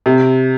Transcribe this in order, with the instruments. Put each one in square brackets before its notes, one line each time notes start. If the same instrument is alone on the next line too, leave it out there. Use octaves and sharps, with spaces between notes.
[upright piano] C3